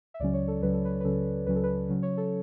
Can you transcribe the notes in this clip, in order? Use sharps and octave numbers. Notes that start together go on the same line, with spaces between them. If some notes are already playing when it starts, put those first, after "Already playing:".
E5
C#2 C#3 F#3 C#4 D5
C#5
A4
C#2 C#3 F#3 C#4 B4
A4
B4
B4
C#2 C#3 F#3 C#4 A4
C#2 C#3 F#3 C#4 B4
A4
B4
C#3 F#3 C#4
C#5
A4